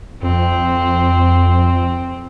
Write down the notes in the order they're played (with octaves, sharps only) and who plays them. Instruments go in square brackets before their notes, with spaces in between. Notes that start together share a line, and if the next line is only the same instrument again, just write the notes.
[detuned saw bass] F2 [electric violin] C4